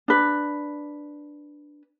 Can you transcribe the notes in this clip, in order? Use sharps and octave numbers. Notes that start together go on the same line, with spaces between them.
D4 B4